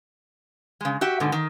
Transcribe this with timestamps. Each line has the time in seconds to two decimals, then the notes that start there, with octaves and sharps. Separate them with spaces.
0.81 C#3 G#3
1.01 F#4 G4 E5
1.20 G#2 B2 D3
1.32 D#3